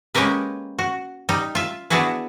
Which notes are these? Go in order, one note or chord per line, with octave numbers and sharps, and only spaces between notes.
G#3 A#3 C#4 G4 A#4 B4
F#4
G3 D#4
F4 E5
B3 D4 E4 F#4 G#4 B4